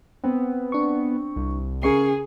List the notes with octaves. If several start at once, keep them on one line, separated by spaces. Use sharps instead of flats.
B3 C4
D4 C#6
C2
C#3 G#4 A#4 C#6 C7